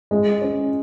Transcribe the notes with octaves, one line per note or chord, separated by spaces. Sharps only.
G#3
C#4